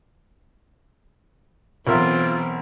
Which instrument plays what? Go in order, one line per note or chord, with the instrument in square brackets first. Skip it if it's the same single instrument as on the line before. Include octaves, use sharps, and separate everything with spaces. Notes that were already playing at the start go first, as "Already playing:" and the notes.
[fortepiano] B1 A#4 E5 [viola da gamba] E3 C4 [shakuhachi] F4